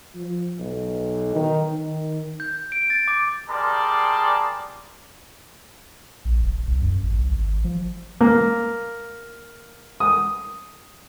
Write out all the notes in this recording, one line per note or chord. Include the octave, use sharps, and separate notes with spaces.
F3
B1
D#3
D#3
G6
D7
A6
D6
G3 G#4 A#4 D5 A5 C6
A#1
D#1
C2
F#2
G#1
C2
G#1
F3
A#3
D#6